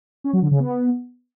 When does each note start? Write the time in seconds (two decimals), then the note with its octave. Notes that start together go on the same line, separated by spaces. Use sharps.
0.24 C#4
0.33 F#3
0.42 D3
0.51 C#3
0.60 B3